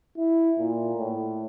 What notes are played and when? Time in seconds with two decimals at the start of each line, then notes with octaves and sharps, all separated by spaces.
0.17 E4
0.59 A#2
0.97 A2